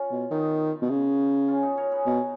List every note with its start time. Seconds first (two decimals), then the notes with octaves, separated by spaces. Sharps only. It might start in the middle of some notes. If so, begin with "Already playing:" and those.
Already playing: C#4 F4
0.11 B2
0.31 D#3 B3 D#4
0.82 B2
0.90 C#3
1.48 C#4 F4
1.63 D#4 F#4
1.77 A#4 C#5
1.91 G#4 B4
2.06 B2 F#4 A#4